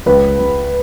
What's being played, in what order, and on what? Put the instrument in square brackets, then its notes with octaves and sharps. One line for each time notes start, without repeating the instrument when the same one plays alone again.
[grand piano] C#2 B4
C#2